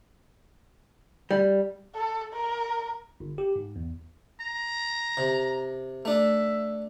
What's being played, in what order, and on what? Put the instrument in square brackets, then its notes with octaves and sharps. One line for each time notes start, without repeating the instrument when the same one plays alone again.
[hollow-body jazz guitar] G3
[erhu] A4
A#4
[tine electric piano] G1
G4
G#2
E2
[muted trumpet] A#5
[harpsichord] C3
[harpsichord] A3 D4 [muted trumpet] E5